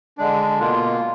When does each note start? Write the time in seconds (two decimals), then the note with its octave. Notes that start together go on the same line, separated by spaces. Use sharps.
0.18 D3 G#3 D4
0.59 B2 A#3 F4